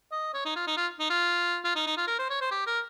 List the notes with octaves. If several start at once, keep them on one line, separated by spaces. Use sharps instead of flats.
D#5
C#5
D#4
F4
D#4
F4
D#4
F4
F4
D#4
D#4
F4
A#4
C5
C#5
C5
G4
A#4